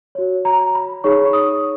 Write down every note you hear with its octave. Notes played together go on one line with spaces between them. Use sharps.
F#4 C#5
A#5
B5
D#4 G#4 C#5 C#6
D#6